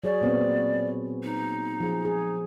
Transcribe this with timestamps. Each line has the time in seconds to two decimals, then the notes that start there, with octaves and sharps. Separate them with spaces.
0.04 F#3 G#4 C#5 D5
0.21 A#2 B3 C4
1.23 D#4
1.80 F3 G#4
2.05 G#4